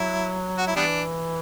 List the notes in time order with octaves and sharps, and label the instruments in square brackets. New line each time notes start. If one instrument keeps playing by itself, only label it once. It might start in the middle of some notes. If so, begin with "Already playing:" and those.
Already playing: [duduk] F#3 [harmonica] E4
[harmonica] F#4
E4
[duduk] E3 [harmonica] G3 B3 D4